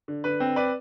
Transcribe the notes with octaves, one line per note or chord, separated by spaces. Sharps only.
D3
D3 B4
C4
B4 D5